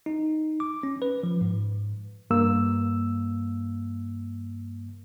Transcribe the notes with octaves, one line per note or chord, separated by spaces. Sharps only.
D#4
D6
C#4
B4
F3
G#2
G2 A#3 E6